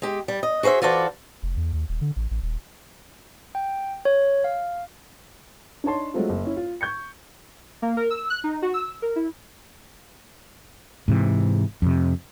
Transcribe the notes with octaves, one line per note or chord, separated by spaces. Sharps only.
G#3 G4
G3
D#5
F#4 G#4 B4 C5 E5
E3 F4 F#4 A4 C5 D5
F1
E2
D#2
D#1
D3
A1
A1
D#1
G5
C#5
F5
D4 D#4 C#5 A5 C6
F#3 G#3 A3 C4 F4
F#1
C#4 E4
F4
C#6 G6 G#6 C#7
A#3
A#4
E6
F#6
D#4
F#4
E6
A#4
E4
G#2 C3 E3
F2 C3